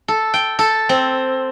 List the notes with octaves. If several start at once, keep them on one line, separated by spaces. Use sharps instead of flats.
A4
G5
A4
C4